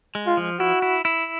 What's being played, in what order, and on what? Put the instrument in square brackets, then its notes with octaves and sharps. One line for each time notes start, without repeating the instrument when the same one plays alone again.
[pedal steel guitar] G#3
[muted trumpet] F4
[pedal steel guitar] F3
[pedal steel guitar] E4 [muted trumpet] F#4
[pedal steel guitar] E4
E4